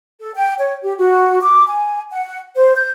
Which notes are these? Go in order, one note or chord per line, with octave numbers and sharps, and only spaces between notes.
A4
G5
C#5
G4
F#4
D6
G#5
F#5
C5
G6